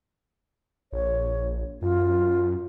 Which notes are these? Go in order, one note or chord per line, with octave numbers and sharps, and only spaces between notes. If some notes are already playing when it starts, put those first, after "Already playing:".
A#1 C#5
F#2 F4